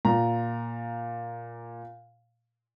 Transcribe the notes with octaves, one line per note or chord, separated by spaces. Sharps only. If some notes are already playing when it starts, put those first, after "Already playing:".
A#2 A#5